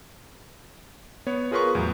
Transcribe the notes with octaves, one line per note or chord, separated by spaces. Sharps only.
B3 C#5
F4 G#4 A#4 B4 C6 C#6
E2 A2 F#3